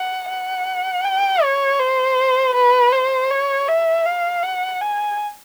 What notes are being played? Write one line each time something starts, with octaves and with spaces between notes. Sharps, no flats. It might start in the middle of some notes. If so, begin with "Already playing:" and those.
Already playing: F#5
F#5
G5
C#5
C5
B4
C5
C#5
E5
F5
F#5
G#5